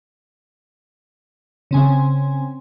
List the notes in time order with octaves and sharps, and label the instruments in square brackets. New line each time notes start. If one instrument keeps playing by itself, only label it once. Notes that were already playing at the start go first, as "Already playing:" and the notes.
[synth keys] C#3 C4 G#5